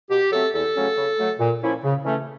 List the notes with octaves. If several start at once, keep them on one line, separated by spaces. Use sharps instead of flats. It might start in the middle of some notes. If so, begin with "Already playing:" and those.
B2 G4
F#3 A3 C4 A4
E2 A4
C#3 F#3 A3 C#4
C#3
F#3 A3
A#2
F3 A#3 C#4 E4
C#3
E3 A3 C#4